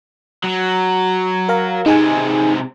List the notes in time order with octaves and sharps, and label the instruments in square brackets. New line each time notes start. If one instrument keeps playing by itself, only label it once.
[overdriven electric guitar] F#3
[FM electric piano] A#4 F5 A#5
[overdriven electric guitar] C3 G#3 [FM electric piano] D#4 G#4 G#5